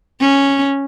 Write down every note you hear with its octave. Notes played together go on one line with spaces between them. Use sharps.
C#4